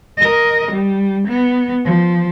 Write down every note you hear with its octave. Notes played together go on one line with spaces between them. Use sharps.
A#4 D#5
G3
B3
F3